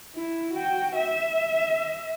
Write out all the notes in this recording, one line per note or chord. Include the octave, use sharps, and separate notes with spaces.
E4
F#4 G5
E5